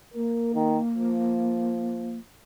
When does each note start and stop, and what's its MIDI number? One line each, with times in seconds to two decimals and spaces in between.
0.14 2.17 58
0.14 0.54 70
0.54 0.78 51
0.94 2.20 53